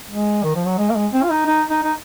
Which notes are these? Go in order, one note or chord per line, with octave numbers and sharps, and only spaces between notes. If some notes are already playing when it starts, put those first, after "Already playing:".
G#3
D#3
F3
F#3
G#3
A#3
G#3
C4
F4
D#4
D#4
D#4
D#4